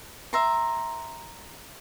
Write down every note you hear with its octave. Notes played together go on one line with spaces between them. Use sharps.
E5 A#5 C6